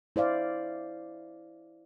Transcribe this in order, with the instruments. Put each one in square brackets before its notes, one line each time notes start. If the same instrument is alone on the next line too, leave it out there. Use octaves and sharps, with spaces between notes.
[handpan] E4 C5 D5 F5